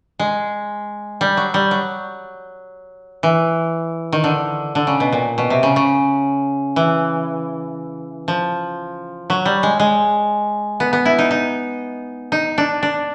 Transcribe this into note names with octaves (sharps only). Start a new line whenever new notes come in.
G#3
G3
F#3
G3
F#3
E3
D#3
D3
D3
C#3
B2
A#2
B2
C3
C#3
C#3
E3
F3
F#3
G3
G#3
G#3
B3
B3
E4
D#4
D#4
D#4
D4
D4